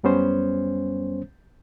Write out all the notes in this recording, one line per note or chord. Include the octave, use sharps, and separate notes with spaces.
F#2 G3 B3 C#4 C5